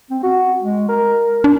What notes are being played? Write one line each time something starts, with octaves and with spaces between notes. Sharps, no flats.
C4
F#4
G#3
A#4
D4